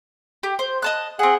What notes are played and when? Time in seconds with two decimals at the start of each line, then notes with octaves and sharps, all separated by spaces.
0.43 G4
0.59 C5
0.82 D#5 A5 F#6
1.19 C4 G#4 F#5